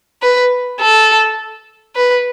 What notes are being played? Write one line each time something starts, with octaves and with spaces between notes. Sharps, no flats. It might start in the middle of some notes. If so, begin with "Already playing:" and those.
B4
A4
B4